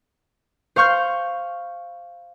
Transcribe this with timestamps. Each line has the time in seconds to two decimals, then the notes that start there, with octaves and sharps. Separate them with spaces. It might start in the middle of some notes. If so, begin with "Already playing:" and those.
0.76 C5 F5 C#6 F6 G6